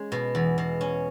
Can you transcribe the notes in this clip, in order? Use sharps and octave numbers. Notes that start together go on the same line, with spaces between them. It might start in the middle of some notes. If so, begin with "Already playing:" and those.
Already playing: G#3 C#4
B2
E2
B2
C#4